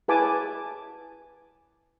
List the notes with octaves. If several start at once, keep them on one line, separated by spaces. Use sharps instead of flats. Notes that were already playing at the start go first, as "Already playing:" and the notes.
E4 G#4 B4 G#5 A5 D6